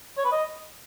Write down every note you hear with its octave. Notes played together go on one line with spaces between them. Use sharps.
C#5
B4
D#5